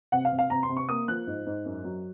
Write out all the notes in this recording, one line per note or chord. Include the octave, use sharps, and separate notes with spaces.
C3 F#5
F5
C3
F5
C3 A#5
C6
C3
C#6
A#3 D#6
F3 F#6
G#2
G#2
F#2
F#3